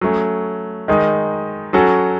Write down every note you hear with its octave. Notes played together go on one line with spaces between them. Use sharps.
F#3 A3 C#4
D#3 G#3 D#4
F#3 C#4 F#4 A4